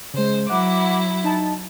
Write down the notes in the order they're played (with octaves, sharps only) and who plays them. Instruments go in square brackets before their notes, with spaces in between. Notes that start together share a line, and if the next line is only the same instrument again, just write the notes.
[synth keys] C#3 G#3 [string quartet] C5
[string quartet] F#3 E4 [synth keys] F#5 D6
[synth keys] D#4 A5